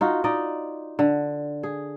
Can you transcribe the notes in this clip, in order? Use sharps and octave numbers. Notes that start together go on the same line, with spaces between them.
D#4 F4 F#4
D#4 D5 D#5
D3
G#4